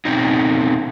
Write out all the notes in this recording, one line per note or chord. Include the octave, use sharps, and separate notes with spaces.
B2 C4 C#4 D#4